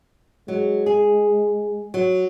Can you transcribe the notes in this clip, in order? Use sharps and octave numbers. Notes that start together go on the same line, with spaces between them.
F#3 G#3
G#4
F#3